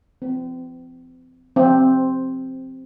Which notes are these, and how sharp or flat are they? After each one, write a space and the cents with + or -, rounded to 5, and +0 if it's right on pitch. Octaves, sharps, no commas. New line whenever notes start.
C4 -35
C4 +5